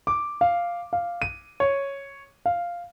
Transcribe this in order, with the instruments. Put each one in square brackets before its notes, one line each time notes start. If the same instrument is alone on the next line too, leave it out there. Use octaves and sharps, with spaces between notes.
[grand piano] D6
F5
F5
D#7
C#5
F5